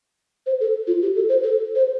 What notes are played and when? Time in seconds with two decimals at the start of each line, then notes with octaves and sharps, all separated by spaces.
0.46 C5
0.61 A4
0.87 F4
1.02 G4
1.16 A4
1.29 C5
1.43 A4
1.75 C5